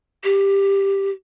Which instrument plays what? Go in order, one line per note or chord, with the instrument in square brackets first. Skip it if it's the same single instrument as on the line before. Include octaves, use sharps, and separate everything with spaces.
[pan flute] G4